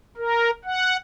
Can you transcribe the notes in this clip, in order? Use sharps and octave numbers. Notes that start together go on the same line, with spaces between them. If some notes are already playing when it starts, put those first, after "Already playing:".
A#4
F#5